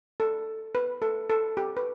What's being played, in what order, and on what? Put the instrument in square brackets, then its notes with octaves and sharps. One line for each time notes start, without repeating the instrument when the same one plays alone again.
[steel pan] A4
B4
A4
A4
G4
B4